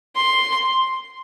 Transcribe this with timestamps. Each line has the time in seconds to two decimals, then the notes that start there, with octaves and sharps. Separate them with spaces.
0.16 C6